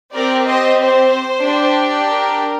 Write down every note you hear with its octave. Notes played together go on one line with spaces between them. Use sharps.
C4 G4 A#4 D5
C5 D#5
C5
D4 G4
A#4